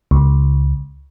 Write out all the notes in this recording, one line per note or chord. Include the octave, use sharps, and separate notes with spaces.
C#2